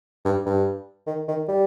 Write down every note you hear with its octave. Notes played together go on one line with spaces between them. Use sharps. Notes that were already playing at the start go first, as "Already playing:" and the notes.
G2
G2
D#3
D#3
G3